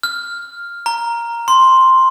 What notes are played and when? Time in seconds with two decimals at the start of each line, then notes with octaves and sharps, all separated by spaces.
0.03 F6
0.86 A#5
1.48 C6